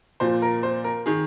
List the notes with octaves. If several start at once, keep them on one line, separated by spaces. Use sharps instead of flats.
A#2 F3 C5
A#4
C5
A#4
D#3 G#4